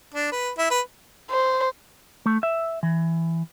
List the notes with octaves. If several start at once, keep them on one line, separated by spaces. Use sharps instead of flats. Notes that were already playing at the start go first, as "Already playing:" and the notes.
D4
B4
E4
B4
C5
A3
E5
E3